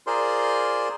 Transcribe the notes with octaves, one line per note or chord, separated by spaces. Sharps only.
F4 G#4 A#4 C5 D5 C6